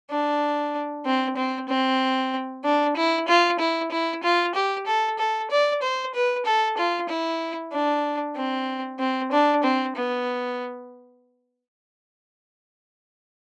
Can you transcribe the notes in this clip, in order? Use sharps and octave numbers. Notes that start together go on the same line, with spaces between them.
D4
C4
C4
C4
D4
E4
F4
E4
E4
F4
G4
A4
A4
D5
C5
B4
A4
F4
E4
D4
C4
C4
D4
C4
B3